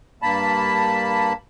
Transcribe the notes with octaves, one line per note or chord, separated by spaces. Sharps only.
G2 A#3 A5 B5